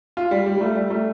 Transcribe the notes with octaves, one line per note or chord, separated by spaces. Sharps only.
F4
G3
G3
G3
A3
G3
A3